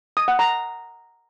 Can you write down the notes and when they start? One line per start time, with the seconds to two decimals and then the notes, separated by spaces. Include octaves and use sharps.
0.17 D#6
0.28 F#5
0.39 A#5